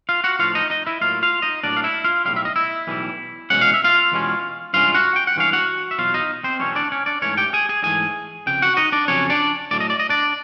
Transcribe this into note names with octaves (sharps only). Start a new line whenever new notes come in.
F4 F5
F#4 F#5
A2 F3 A3 D4 F4 F5
D#4 D#5
D#4 D#5
E4 E5
A2 F#3 A#3 F4 F5
F4 F5
D#4 D#5
A2 F#3 A#3 D4 D5
F5
E4 E5
F4 F5
B1 A2 E3 G3 F5
E5
D#5
E4 E5
B1 A2 E3 G3
E2 B2 G#3 C#4 F#5
F5
E5
F4 F5
E2 B2 G#3 C#4
G2 E3 G#3 C#4 F4 F5
F#4 F#5
G5
F#5
G2 E3 G#3 C#4 F5
F#4 F#5
E5
E2 B2 F#3 F4 F5
D#4 D#5
C4 C5
E2 B2 F#3 A3 C#4 C#5
D4 D5
C#4 C#5
D4 D5
G#2 E3 A3 C#4 C#5
G4 G5
G#4 G#5
G#4 G#5
G#2 E3 A3 G#4 G#5
F2 C#3 G5
F#4 F#5
D#4 D#5
D4 D5
F2 C#3 F#3 C#4 C#5
D4 D5
A2 F#3 A3 D5
D#5
D5
D#5
D4 D5